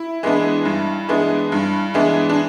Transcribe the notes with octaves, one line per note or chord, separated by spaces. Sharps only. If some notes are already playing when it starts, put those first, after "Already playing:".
Already playing: E4
E3 G#3 B3 D4
G2
E3 G#3 B3 D4
G2
E3 G#3 B3 D4
D4